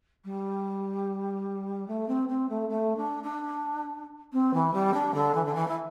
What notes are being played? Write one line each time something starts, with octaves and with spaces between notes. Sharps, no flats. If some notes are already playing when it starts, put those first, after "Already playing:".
G3
A3
C4
C4
A3
A3
D4
D4
C4
E3
G3
D4
D3
E3
D3
E3
E4